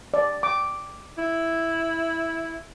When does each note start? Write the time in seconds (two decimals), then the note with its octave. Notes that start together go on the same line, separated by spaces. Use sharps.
0.14 D5
0.43 D6
1.18 E4